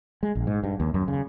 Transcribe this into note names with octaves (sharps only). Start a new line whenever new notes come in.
G#3
A#1
G#2
G2
D#2
F#2
C#3